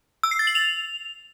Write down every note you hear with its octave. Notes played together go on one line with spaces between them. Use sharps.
E6
C7
A6
F#7
F7